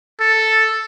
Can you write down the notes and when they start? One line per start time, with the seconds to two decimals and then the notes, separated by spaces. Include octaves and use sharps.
0.20 A4